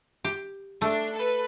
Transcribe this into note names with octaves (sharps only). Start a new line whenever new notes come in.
G4
A3 D4
A4 B4